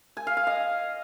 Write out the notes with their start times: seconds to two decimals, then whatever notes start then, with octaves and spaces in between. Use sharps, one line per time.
0.17 G#5
0.27 F5
0.37 F5
0.47 D#5